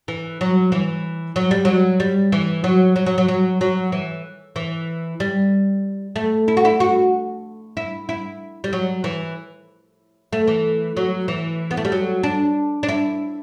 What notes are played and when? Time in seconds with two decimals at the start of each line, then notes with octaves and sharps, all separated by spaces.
0.08 E3
0.41 F#3
0.72 E3
1.36 F#3
1.51 G3
1.65 F#3
2.00 G3
2.32 E3
2.64 F#3
2.96 F#3
3.06 F#3
3.18 F#3
3.28 F#3
3.61 F#3
3.92 E3
4.56 E3
5.20 G3
6.16 A3
6.48 E4
6.57 F#4
6.65 E4
6.80 F#4
7.77 E4
8.09 E4
8.64 G3
8.73 F#3
9.04 E3
10.33 A3
10.47 E3
10.97 F#3
11.28 E3
11.71 B3
11.77 A3
11.85 G3
11.92 F#3
12.23 D4
12.83 D4
12.89 E4